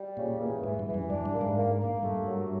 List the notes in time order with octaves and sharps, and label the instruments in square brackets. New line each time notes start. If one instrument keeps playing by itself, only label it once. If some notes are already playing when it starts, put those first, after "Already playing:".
Already playing: [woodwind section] G3
[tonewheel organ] A#2 [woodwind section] C#3
[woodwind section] E2
[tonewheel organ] G#2 [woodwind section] E3
[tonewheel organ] G2
[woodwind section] E3
[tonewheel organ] F#2
[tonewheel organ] G2 [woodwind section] D4
[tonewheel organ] G2
[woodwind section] A#3
[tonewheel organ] G#2
[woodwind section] A#3
A#3
[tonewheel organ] G2 [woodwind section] A3
[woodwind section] F#3